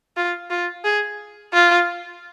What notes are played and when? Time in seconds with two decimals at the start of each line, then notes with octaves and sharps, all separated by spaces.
0.17 F4
0.50 F4
0.84 G#4
1.53 F4